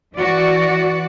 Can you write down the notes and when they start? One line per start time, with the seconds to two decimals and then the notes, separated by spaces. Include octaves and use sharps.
0.16 E3 F#4 D5